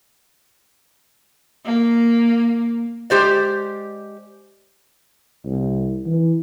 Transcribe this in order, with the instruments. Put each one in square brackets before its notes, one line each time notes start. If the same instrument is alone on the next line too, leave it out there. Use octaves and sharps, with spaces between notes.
[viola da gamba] A#3
[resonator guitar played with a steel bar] G#3 G4 C5 D5
[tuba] C2
E3